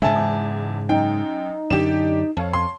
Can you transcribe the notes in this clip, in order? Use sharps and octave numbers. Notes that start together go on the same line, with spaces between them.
D2 G#2 C#3 G#3 E5 G#5 A5
E2
F#2 D#4 G5
F#2 D3 D4 G4 E7
F2 C#5 F5 A5
C6